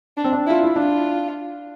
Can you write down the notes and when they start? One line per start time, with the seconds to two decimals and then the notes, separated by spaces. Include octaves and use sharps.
0.17 D4
0.24 C4
0.32 D4
0.47 E4 F4
0.63 E4
0.76 D4 F4